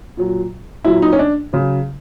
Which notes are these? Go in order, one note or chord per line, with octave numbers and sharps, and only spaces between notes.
A#2 F#3
A#2 F#3 E4
D#4
C#4
D4
C#3 F#3